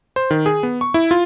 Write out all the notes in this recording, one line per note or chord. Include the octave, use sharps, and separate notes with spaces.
C5
D#3
G#4
B3
C#6
E4
F4